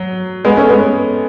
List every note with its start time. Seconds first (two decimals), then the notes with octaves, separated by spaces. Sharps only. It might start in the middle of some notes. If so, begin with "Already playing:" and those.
Already playing: F#3
0.45 G#3 B3
0.57 A3 C#4
0.69 G#3 B3